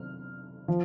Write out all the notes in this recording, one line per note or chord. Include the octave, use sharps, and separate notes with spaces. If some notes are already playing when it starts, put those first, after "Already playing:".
Already playing: C3 F#3 F6
F3